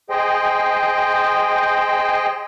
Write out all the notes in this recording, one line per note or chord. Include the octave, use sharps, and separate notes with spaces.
G#4 C5 D#5 G5